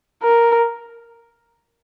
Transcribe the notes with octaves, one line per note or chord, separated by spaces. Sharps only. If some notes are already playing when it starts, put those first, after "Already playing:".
A#4